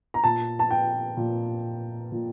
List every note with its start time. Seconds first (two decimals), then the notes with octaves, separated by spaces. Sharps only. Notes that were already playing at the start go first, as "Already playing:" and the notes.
0.14 A#5
0.24 A#2 A5
0.59 A5
0.71 G5
1.17 A#2
2.12 A#2